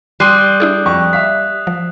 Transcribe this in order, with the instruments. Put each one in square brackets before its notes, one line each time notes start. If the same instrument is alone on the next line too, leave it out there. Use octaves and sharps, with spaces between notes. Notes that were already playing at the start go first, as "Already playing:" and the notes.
[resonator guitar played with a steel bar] G3 [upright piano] C6 C7 D#7 [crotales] D#6 F#6
[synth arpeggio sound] D4 E4 G#4
[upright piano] F2 C#6
E5 F5 B6
[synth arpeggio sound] F3